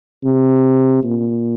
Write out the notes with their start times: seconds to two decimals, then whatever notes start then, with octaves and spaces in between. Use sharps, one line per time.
0.24 C3
1.04 A#2